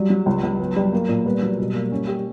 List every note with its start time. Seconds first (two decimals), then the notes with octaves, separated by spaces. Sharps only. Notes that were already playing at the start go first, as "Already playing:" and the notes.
Already playing: F#3 G3
0.10 F#3
0.26 C#2
0.43 C#2
0.59 F#3 B3
0.76 G3
0.93 A#3
1.09 A#2
1.25 G3 B3
1.42 F#3
1.59 B2
1.75 A#3
1.92 C#4
2.07 G4